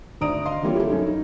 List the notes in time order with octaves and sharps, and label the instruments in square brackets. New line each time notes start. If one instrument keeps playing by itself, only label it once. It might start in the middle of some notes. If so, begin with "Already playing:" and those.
[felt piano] G#1 D2 D5 A#5 D#6 D7
D#5 F5 C6
D3 E3 G3 A#3 F4 C#5
E4 G4 A4
F#2 C#4 D#4
D#4